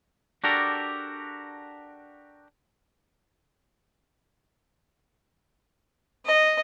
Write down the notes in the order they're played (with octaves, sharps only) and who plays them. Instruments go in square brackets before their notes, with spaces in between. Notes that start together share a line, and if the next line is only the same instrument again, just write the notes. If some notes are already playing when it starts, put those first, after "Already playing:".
[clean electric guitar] D4 F#4 G4 A4 A#4
[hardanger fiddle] D#5